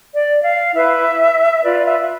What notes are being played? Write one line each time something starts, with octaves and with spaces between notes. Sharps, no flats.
D5
F5
E4 B4 E5
F4 B4 D5
E5